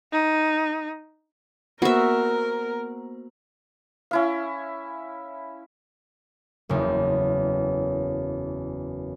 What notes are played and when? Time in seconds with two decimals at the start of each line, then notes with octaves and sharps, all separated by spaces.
0.12 D#4
1.82 A#3 B3 F#4 A#4 C5 E5
4.11 C#4 E4 F5
6.69 F#1 E2